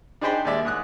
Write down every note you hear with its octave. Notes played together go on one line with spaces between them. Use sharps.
D4 D#4 G#4 C5 G5 B5
D#2 G#3 D5 E5
G#2 D#6 F#6